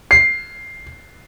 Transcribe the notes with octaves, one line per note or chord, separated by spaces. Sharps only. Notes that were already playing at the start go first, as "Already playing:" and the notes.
C7